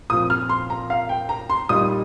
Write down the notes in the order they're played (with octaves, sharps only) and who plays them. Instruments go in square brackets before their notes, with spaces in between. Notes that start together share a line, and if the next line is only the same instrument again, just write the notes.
[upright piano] A#2 F3 C4 D#6
F6
C6
A#5
F5
G5
A#5
C6
A#2 G3 D#4 D#6